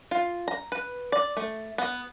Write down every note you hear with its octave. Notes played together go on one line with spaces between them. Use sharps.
F4
A#5
B4
D5
A3
B3